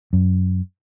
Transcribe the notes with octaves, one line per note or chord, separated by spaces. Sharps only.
F#2